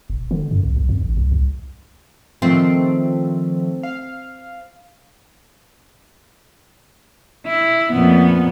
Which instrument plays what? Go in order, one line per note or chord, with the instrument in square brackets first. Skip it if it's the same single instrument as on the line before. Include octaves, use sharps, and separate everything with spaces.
[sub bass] E1
D3
F#2
B1
B1
F2
A1
C2
C2
[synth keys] D#3 F3 A3 [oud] C4
[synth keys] F5
[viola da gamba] E4
F2 A#2 B3